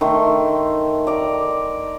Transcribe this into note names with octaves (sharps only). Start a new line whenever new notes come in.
D#3 A3 C6
D5 A#5